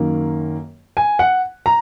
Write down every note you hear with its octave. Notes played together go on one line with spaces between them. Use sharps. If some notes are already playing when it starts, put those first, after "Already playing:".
Already playing: F#2 D#3 A#3
G#5
F#5
A#5